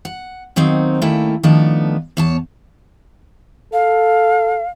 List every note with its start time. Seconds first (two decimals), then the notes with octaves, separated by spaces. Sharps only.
0.05 F#5
0.56 D#3 F#3 A#3 C4 D#4
1.01 D#2 A3 A#3 C#4 E4 G5
1.43 D#3 F3 A3 B3 D4
2.17 E2 C#5 A5
3.73 A4 F5